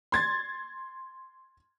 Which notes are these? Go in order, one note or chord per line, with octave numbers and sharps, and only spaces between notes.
C6 G#6 A6